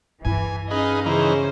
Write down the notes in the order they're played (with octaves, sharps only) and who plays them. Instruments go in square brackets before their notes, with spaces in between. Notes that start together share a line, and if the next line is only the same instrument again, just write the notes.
[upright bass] G2 E4 [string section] E3 [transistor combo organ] G#5
[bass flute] C#4 [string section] D#4 D#5 F5 [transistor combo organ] G#4 B4
[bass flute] C#3 [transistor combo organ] E3 D#4 [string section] C#4 C5